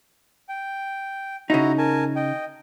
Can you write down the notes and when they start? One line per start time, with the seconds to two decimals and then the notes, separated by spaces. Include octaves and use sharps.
0.49 G5
1.50 C#3 D#4 E4 F#4 A#5
1.78 A#4 G#5 A5
2.16 D#5 G5